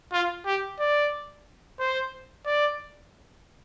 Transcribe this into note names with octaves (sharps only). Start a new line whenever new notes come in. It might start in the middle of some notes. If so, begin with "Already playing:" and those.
F4
G4
D5
C5
D5